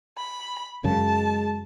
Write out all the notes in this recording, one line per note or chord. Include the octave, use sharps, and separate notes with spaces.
B5
F#2 C#3 G#3 A5